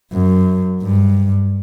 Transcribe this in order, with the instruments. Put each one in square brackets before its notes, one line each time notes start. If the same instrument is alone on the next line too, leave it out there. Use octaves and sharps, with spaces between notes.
[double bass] F#2
G2